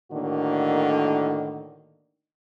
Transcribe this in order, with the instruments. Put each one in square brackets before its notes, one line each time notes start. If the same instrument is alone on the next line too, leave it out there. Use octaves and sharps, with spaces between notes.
[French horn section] A2 D3 D#3 A#3 F#4